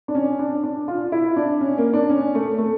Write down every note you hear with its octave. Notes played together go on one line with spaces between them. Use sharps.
D4
C#4
D4
D4
F4
E4
D4
C#4
A#3
D4
C#4
A3
A3